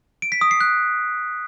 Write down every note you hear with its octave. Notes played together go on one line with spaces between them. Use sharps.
D7
B6
D#6
C7
F#6